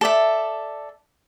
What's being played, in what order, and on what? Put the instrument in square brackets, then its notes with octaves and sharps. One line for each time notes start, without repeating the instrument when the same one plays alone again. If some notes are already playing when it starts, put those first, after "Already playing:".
[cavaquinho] A4 D5 E5